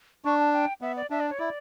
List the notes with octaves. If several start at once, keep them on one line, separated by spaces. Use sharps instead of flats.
D4 C#6
A5
G5
B3 E5
D5
D4 E5
D5
C#5
E4 D5